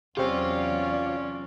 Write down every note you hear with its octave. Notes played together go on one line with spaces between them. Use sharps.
E2 C3 F#3 C4 C#4 F4 D5